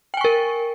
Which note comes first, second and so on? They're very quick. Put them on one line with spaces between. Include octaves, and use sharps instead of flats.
G5 G#5 C#6 A#4